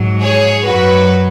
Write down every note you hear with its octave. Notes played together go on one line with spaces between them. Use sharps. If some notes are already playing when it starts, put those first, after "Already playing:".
Already playing: G#2 F#3
G#4 C#5
F#2 F#3 F#4 B4